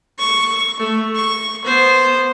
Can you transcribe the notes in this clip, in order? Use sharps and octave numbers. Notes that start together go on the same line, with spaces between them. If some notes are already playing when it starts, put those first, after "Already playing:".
C#6
A3
C#6
B3 C5